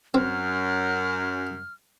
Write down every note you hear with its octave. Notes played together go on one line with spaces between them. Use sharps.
F#2 C4 F6